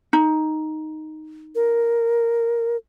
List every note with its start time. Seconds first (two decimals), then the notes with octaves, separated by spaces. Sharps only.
0.13 D#4
1.55 A#4